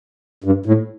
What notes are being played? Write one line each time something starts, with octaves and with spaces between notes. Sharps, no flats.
G2
A2